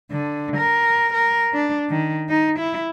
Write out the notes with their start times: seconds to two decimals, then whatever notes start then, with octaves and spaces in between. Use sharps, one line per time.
0.11 D3
0.57 A#4
1.13 A#4
1.53 D4
1.90 D#3
2.29 D#4
2.59 E4